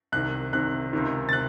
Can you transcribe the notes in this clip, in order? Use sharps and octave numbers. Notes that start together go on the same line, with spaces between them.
C2 C3 D#3 F#6
C2 C3 D#3 F#6
C#2 C3 D#3
A6
C3 F#6